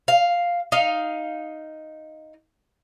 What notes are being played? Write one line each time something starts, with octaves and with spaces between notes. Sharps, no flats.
F5
D#4 F5